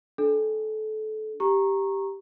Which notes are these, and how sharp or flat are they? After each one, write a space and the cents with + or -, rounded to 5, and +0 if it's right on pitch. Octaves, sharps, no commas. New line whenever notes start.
D4 +0 A4 -25
G4 +0 A#5 +0 C#6 -20